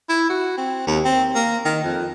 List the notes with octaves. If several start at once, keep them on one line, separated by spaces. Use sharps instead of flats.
E4
F#4
C4
D#2
C4
A#3
D#3
F2